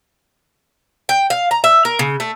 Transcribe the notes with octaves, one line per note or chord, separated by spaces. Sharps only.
G5
F5
A#5
E5
A#4
C#3
A3